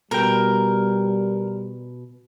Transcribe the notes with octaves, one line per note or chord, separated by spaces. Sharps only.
B2 G3 A#4 G5